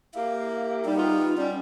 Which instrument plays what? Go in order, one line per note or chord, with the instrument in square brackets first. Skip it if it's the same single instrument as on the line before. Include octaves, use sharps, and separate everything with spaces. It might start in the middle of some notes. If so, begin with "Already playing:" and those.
[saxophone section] A#3 E4 G4 [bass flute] F5
[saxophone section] G3 [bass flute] D#4
[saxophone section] G3 B3 F4
[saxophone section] G3 [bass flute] C#4